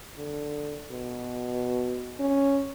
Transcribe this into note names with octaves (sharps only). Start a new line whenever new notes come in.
D3
B2
C#4